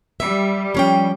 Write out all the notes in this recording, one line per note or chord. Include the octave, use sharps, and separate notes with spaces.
G3 E5
F3 C#4 G5